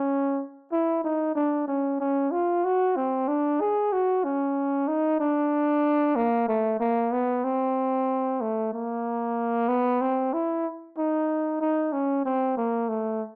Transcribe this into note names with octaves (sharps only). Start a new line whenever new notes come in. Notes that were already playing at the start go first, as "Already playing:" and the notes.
Already playing: C#4
E4
D#4
D4
C#4
C#4
F4
F#4
C4
D4
G#4
F#4
C#4
D#4
D4
A#3
A3
A#3
B3
C4
A3
A#3
B3
C4
E4
D#4
D#4
C#4
C4
A#3
A3